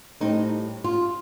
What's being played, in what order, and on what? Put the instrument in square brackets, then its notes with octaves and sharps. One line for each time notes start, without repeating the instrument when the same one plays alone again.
[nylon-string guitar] A2 G3 C4 D#4
F4